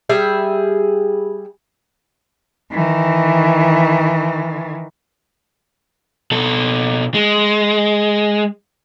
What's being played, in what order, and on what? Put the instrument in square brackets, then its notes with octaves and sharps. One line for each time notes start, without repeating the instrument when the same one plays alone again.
[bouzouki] G3 G#4 E5
[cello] D#3 E3
[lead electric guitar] B2 A4
G#3